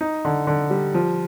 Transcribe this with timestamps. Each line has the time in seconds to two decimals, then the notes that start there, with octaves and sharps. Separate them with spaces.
0.01 D#4
0.25 D3
0.47 D3
0.70 G3
0.94 F3